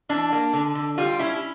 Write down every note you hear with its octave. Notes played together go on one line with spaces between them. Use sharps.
E3 D4
A#3
D3
D3
G3 F4
C#4 E4